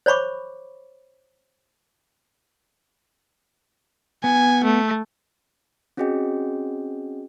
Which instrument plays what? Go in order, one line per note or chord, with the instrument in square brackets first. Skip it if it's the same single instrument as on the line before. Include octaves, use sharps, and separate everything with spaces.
[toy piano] C5 C#5 B5 C#6 D6
[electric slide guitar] B3 [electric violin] G#5
[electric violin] A3
[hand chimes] C4 C#4 F#4 G#4 D#5 G5